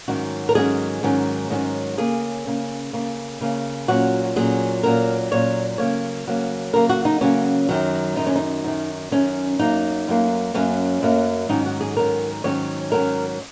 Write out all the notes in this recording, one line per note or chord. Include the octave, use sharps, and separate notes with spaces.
G#2 D#3 F#3 C#4 F#4
A#4
G#2 D#3 F#3 C#4 G#4
G#2 D#3 F#3 C#4
G#2 D#3 F#3 C#4
C#3 A#3 C#4 G#4
C#3 A#3 C#4
C#3 A#3 C#4
C#3 A#3 C#4
A#2 F#3 C#4 F#4
A#2 F#3 C#4 G#4
A#2 F#3 C#4 A#4
A#2 F#3 C#4 C#5
C#3 F#3 A#3 C#5
C#3 F#3 A#3
C#3 F#3 A#3 A#4
F#4
D#4
C#3 F#3 A#3 C#4
F#2 D#3 F#3
F#2 D#3 F#3 D#4
C#4
D#4
F#2 D#3 F#3
F#2 D#3 F#3 C#4
F#2 F#3 A#3 D#4
F#2 F#3 A#3
F#2 F#3 A#3 C#4
F#2 F#3 A#3
G#2 D#3 F#3 C#4 D#4
F#4
G#4
G#2 D#3 F#3 C#4 A#4
G#2 D#3 F#3 C#4 C#5
G#2 D#3 F#3 C#4 A#4